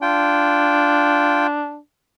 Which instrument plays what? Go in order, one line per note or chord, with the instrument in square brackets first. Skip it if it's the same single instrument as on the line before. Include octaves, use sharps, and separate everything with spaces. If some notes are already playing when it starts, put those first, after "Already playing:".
[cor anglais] D4 [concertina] F4 G5